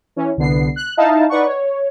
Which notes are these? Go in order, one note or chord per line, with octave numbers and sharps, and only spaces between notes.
E3 C#4
C2 D3 B3 C7
F#6
D#4 E4 F5 A5
D#4 B4 D5 F#5 C#6
C#5